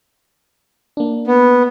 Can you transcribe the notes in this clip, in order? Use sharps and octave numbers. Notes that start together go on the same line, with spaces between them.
A#3 D4
B3